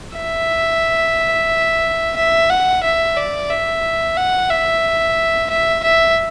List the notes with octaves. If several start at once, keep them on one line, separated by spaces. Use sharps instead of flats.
E5
E5
F#5
E5
D5
E5
F#5
E5
E5
E5